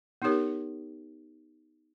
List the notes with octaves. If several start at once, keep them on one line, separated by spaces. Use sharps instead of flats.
B3 D#4 G4 A#4 C#5